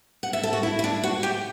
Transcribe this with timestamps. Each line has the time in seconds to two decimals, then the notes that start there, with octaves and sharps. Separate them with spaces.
0.23 F#5
0.33 E5
0.43 A4
0.53 F#4
0.63 E4
0.79 E4
0.84 D4
1.04 F#4
1.23 G4